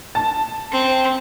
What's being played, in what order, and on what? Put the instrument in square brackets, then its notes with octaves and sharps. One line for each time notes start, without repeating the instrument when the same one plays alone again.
[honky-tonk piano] A5
[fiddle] C4